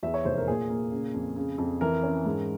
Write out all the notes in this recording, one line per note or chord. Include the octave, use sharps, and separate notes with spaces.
E2 E5
C#5
F1 C5
A#4
A#2 G#4
A#3
C#3
F2
C#3
F2
E3 A#4
C#4
G#2